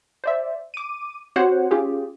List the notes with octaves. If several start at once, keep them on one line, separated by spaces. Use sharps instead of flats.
C5 D5 E5
D6 D#7
C4 F#4 G4 C5 C#5 F#5
C#4 F4 G4 G#4